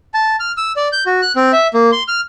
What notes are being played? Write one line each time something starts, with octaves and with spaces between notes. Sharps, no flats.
A5
F6
E6
D5
G6
F#4
F#6
C4
E5
A#3
C6
F6